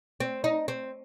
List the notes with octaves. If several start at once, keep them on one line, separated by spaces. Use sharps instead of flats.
C4
D#4
C4